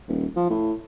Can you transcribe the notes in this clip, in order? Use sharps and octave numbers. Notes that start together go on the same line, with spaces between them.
D#1
F3
A2